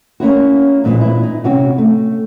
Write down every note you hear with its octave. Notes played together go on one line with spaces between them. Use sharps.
A#3 C#4 E4 F#4
F2 A#2 E3 G#3
A#2 E4
D#4
C3 C#4 F#4
A3